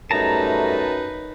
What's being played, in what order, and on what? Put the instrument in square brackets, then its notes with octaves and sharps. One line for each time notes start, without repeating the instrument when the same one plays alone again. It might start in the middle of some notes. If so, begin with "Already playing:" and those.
[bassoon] F#2 [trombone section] G3 A3 [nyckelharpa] D#4 B4 [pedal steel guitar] A5 A#5